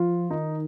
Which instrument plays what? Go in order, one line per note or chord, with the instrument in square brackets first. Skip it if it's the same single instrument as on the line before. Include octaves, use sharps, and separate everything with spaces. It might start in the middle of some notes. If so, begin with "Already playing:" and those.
Already playing: [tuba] F3 [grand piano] F4
[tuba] D#3 [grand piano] D#4